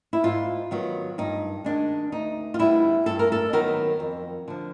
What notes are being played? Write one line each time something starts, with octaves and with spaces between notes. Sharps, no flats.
E4
G#2 F4
D#3 F#3 B3
G2 D#4
D#3 G#3 D4
D2 D#4
F4
D3 G3 B3 E4
G2 A4
A#4
A4
D#3 F#3 B3 A#4
F2
D3 F3